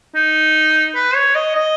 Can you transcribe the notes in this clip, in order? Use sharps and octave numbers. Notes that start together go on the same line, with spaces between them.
D#4
B4
C#5
D#5
D#5